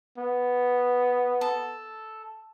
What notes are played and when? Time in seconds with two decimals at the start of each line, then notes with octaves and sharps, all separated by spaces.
0.18 B3
1.41 A4